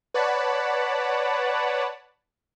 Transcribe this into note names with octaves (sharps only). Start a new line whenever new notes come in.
B4 C#5 D5 F#5 A5 B5